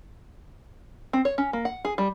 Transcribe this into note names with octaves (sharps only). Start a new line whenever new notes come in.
C4
C#5
C#4
A#3
F#5
G#4
G3